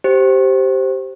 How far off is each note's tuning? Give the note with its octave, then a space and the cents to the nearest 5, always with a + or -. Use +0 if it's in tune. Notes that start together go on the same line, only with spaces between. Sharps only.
G4 -15 C5 +5